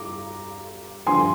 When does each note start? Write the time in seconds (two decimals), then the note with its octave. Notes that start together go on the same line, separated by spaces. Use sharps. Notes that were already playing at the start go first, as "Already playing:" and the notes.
Already playing: G2 A#5 D6
1.07 G2 D3 F3 G#5 C6